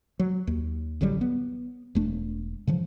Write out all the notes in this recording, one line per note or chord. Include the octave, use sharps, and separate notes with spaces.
F#3
D#2
A1 D3 F#3 G3
B3
E1 A3 D4
C#3 E3 F3